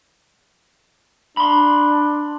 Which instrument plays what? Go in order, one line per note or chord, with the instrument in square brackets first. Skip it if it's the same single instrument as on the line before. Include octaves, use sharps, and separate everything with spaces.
[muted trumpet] D4 [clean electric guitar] B5 C6